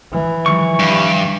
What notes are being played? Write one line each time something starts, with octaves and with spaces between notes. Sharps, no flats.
E3
D#3 F3 G3 C#6
G2